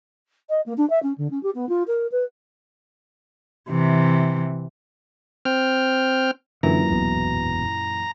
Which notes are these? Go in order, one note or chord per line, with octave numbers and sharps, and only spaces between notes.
D#5
A#3
D4
E5
C#4
D3
C#4
G4
B3
F4
A#4
B4
C3 E3
C4 G5 F6
F#2 A#2 D3 E3 A#5
E1 B1 B2